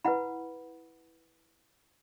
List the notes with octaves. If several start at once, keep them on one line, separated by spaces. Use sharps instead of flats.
E4 B4 F#5 B5